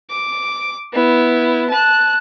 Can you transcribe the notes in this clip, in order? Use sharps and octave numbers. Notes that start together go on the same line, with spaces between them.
D6
B3 E4
A5 F#6